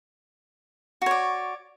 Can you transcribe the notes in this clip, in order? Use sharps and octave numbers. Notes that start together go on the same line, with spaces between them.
F#4 C#5 D5